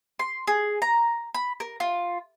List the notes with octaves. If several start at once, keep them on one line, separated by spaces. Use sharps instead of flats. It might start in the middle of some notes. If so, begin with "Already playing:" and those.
C6
G#4
A#5
B5
A#4
F4